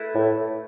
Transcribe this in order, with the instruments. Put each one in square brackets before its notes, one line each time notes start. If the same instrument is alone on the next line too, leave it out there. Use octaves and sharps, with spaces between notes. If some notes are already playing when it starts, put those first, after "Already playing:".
Already playing: [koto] A3 E4 B4
[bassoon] A2